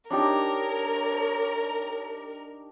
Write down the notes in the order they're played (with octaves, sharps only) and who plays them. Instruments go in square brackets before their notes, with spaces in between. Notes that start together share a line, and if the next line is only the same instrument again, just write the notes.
[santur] D4 D#4 G4 [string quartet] A#4 [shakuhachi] C#5